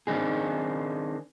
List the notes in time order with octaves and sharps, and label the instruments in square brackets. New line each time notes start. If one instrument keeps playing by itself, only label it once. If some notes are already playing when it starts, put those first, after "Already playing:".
[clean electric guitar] D#3 C4 D4 D#4 G#4